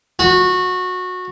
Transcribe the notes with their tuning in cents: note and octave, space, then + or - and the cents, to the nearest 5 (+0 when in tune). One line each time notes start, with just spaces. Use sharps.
F#4 -20